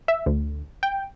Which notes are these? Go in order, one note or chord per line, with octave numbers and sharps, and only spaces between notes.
E5
D2
G5